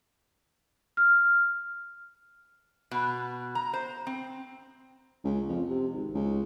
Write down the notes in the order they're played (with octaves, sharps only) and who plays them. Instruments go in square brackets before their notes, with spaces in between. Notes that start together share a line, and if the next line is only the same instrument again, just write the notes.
[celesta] F6
[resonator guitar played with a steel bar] B2
A#5
C5
C4
[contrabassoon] C#2
F2
C3
G#1
C#2